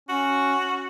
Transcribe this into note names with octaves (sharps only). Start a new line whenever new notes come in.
C#4 F#4